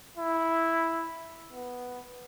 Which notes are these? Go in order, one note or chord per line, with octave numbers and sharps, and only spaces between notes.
E4
B3